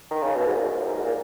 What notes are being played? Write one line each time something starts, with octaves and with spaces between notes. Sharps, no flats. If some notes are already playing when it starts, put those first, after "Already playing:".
D#3
C#3
B2
G#2
A#2
F#2
G#2
F#2
G#2
A#2